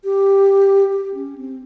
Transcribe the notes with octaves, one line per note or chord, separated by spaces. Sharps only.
G4
G4
C#4
C4